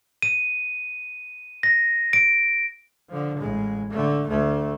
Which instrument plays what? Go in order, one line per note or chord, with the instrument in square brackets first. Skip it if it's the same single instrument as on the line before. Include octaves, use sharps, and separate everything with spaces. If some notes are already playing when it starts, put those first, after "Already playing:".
[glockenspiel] D#7
A#6
D7
[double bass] D3 F3
A1 G#3
D3 A3
D2 A3